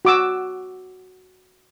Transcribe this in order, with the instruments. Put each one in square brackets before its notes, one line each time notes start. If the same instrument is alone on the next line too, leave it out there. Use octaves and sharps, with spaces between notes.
[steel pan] F#4 D6 E6